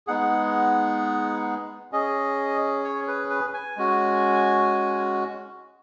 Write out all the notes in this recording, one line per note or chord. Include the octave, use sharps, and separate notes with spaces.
G#3 B3 D#4 G#4 F#5
C#4 G#4 D#5
C#5
B4
B4
G#5
G#3 C#4 F#4